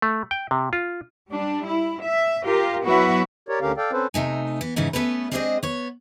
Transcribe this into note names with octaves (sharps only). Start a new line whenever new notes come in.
A3
G5
C3
F4
G3 D4
E4
E5
F4 G4 A#4
F#3 B3 E4 F#4 B4 E5
G4 A#4 C#5 D5
D2 D3 C#4 G4 A#4 F5
A4 D5 F5 G5
C4 C#4 A4 B4 C5
C3 A3 D#4 G#5
E3 B3
G#2 C#3 E3 C#4 D#4
A3 B3 C#4 A4 B4
G#3 C4 D4 G#4 C5 D#5
B3 C#5